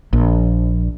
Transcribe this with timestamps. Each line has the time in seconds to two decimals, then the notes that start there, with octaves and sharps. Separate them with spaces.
0.13 A#1